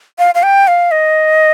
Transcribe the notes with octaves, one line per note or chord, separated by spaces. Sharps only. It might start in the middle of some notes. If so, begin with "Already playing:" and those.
F5
F5
G5
F5
D#5